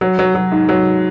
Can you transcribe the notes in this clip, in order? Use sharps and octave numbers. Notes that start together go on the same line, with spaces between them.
F#3
F#3
F#3
G#2
F#3